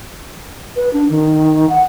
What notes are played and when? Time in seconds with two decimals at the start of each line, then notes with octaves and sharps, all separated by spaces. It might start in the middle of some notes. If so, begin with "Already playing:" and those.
0.76 B4
0.93 D4
1.10 D#3
1.69 F#5